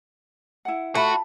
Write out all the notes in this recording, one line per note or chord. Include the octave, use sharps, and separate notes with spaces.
E4 F#5
A3 F4 F#4 B5